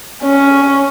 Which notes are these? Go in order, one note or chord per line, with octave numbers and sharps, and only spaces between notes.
C#4